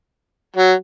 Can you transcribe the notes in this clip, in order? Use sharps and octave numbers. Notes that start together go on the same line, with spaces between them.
F#3